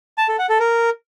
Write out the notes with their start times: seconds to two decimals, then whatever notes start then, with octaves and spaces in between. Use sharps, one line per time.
0.18 A5
0.28 A4
0.39 F#5
0.49 A4
0.60 A#4